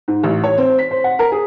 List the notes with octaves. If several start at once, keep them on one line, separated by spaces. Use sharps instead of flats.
G#2
A1
C#5
C4
B6
C5
F#5
A#4
G#4